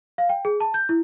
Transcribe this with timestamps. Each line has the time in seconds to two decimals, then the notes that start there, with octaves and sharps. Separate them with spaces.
0.18 F5
0.29 G5
0.45 G#4
0.60 A5
0.74 G6
0.89 E4